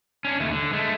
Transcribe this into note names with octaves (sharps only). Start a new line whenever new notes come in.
C#4 D4
D#2 A3
D3
G#3 A3